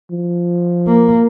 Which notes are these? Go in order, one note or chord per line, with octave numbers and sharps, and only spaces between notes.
F3
A#3